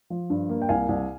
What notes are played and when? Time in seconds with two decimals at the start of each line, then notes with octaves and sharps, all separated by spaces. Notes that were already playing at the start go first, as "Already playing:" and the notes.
0.10 F3
0.30 G2
0.49 A#3
0.62 G5
0.69 C2 F5 G#5
0.89 C2